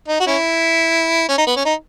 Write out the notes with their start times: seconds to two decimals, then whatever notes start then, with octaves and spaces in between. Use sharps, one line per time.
0.08 D#4
0.20 F#4
0.27 C#4 E4
1.29 C#4
1.38 D#4
1.47 B3
1.56 C#4
1.65 D#4